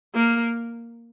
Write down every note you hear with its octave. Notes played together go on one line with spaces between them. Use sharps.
A#3